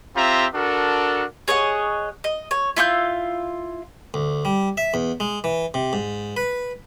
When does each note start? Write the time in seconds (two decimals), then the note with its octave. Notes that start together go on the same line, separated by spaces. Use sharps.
0.17 C4 F4 G4 E5 A#5
0.55 D4 F#4 A4 A#4
1.48 G#4 C#5 D#5 F#5
2.24 D#5
2.51 C#5
2.77 E4 F4 C#6 G6
4.14 D2
4.45 G3
4.77 E5
4.94 E2
5.20 G#3
5.44 E3
5.74 C3
5.93 G#2
6.37 B4